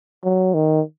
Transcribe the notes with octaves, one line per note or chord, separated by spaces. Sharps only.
F#3
D#3